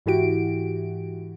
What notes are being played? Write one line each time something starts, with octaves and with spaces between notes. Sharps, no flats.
G#2 E3 E4 F#4 G4 D7